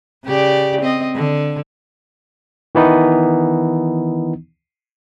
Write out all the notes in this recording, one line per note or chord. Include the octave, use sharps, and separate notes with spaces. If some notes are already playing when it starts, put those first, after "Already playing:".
C#3 G4 D5
C4 D#5
D3
D#3 E3 B3 D#4